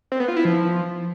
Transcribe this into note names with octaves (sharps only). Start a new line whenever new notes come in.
C4
B3
F4
E4
F3